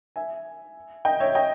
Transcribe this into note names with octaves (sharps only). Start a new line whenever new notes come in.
E5 G#5
D#5 G5
C#5 E5
D#5 G5